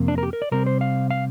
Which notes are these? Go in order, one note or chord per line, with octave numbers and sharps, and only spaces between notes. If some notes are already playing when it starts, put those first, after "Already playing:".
Already playing: F2 C3 A#3
D4
A#4
G4
A#4
D5
C3 G3 C4 A#4
C5
F5
F5